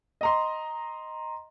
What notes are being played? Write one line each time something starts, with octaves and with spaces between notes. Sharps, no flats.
D#5 A#5 C6